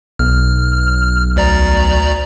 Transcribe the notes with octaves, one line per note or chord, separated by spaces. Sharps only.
B1 F6
D2 D5 A#5